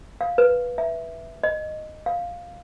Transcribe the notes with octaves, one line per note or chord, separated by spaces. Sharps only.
F5
B4
E5
D#5
F5